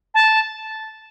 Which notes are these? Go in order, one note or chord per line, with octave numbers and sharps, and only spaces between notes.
A5